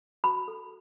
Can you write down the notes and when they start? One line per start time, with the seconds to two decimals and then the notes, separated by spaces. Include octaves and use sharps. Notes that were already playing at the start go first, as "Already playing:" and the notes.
0.24 F#4 B5
0.48 A4